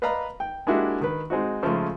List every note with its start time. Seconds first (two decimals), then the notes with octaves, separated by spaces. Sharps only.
0.02 B4 D5 D#5 F5 A#5 B5
0.40 G5
0.67 G#3 A#3 D4 E4 F#4 G4
1.01 D#3 B4
1.30 G#3 C4 D#4 F#4
1.63 C#3 F3 G#3 A3